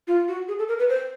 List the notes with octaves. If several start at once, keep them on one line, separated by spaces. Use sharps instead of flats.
F4
F#4
G#4
A4
A#4
B4
C5